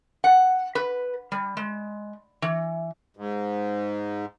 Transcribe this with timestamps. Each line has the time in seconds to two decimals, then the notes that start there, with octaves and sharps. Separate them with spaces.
0.24 F#5
0.75 B4
1.32 G3
1.57 G#3
2.42 E3
3.17 G#2